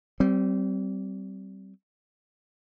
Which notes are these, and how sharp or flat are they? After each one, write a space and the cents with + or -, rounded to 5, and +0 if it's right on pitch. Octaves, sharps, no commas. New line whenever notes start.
G3 -30 C4 +0